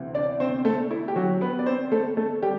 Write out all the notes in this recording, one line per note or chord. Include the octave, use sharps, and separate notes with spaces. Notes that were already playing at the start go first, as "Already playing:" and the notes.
Already playing: D2 C3 E3
D4 D5
C4 C5
A3 A4
E4
G4
F#3 F#4
B3 B4
D5
C4 C5
A3 A4
A3 A4
G3 G4